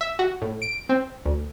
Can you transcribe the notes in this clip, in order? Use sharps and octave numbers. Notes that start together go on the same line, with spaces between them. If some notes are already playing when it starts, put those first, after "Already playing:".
E5
F#4
A2
D7
C4
D2